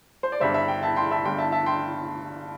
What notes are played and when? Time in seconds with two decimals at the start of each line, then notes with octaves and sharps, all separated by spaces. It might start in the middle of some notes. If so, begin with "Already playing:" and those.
0.23 C5
0.32 D5
0.40 G1 G2 G3 C5 E5
0.54 E5
0.68 G5
0.83 E5 A5
0.96 G5 C6
1.11 E5 A5
1.25 G1 G2 G3 G5 C6
1.38 E5 A5
1.52 E5 A5
1.66 G5 C6